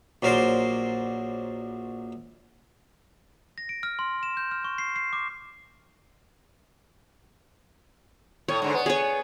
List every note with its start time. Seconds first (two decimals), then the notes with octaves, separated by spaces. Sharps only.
0.23 A#1 F#3 A#4 C5 D5 C6
3.58 A#6
3.69 D7
3.83 F6
3.99 C6
4.23 E7
4.37 G6
4.51 F6
4.64 C#6
4.78 C7
4.96 C7
5.13 D6
8.48 A2 C#5
8.62 G#2 D3
8.74 B3
8.86 G#4 C#5